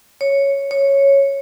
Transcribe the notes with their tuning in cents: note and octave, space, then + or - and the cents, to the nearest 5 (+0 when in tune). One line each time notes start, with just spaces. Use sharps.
C#5 +0
C#5 -5